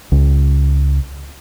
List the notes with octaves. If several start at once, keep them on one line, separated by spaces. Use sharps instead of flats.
C#2